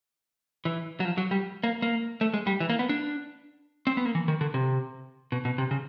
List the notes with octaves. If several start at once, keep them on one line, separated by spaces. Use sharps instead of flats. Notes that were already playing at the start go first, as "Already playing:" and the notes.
E3
F#3
F3
F#3
G3
A#3
A#3
A3
G#3
G3
E3
A#3
B3
D4
C4
B3
A#3
E3
D#3
D3
C3
B2
B2
C3
C#3